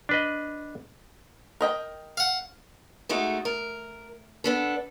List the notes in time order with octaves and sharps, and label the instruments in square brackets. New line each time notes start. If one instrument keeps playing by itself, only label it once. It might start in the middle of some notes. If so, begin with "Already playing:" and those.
[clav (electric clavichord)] D4 B4 D#5
[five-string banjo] A#4 D#5 G5
[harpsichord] F5 F#5
[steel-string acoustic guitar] G#3 A3 D#4 F#4
A#4
B3 D4 A4